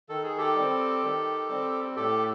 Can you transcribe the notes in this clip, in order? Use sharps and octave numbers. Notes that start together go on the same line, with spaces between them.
D#3 A4
G#4
G4 A4
G3 C4
D#3
G3 C4
A2 G4 A4